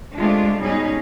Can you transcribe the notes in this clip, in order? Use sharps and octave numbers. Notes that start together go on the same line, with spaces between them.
C3 G#3 A3 D4 F4
G#2 B2 G3 C#4 D#4 G#4